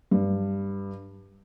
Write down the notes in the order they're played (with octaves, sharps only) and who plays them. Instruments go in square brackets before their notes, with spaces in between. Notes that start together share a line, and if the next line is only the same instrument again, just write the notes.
[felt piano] G2